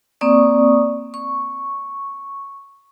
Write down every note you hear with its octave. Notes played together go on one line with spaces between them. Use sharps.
A#3 C4 D5 C#6 D#6
C#6